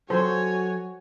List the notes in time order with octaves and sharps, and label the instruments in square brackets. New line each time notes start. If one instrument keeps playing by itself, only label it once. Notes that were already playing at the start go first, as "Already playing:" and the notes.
[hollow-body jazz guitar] F#3 A4 [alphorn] F#4 [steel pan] C5 [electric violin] C#5 G#5